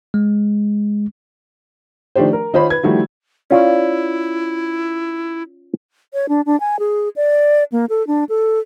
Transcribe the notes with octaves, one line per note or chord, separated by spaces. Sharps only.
G#3
D#3 F3 A3 D4 G4 C5
A#4
D#3 D#4 F4 C5 C#5 B5
B4 G#6
D#3 F3 G3 A3 E4 F#4
C#4 E4 F4 D5
C#5
D4
D4
G#5
G#4
D5
A#3
A4
D4
A4